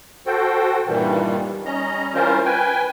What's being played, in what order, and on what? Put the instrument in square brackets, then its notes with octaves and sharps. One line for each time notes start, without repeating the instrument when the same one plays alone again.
[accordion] F#4 A4 C5 G5
G2 A#2 D#3 E3 G3
G3 C#4 D#5 A#5
E3 G3 C#4 F4 A#4 C5
B4 G5 G#5